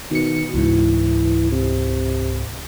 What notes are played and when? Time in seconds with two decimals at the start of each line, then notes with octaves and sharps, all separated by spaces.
0.11 B2 D#3 C#7
0.54 C#2 G#2 E3
1.52 C3